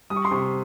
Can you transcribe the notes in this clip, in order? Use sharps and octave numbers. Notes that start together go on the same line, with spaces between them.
G3 D#6
C#6
C6
C3 C#6